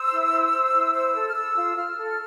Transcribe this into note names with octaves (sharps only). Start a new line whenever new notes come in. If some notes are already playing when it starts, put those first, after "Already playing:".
Already playing: C5 E6
E4
C5
C5
E4
C5 E6
A4
F6
A4 E6
F4
F4 F6
A4